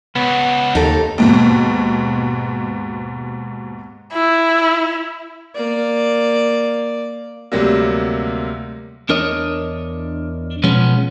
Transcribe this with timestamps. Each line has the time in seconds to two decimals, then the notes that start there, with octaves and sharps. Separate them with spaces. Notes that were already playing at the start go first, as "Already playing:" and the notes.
0.16 C#2 B3
0.75 D#2 D#4 A4
1.18 D#2 G#2 B2
4.13 E4
5.55 A#3 D5
7.52 D2 C3 F#3 G3 A#3
9.09 E2 D4 A#4 C#5 D#5
10.63 B2 F3 G#3 B3 C#4